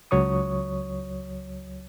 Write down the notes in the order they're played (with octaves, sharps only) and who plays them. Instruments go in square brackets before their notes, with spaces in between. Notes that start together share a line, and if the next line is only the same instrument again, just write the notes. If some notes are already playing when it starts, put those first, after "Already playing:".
[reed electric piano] C#2 F#3 C#5 C#6 D#6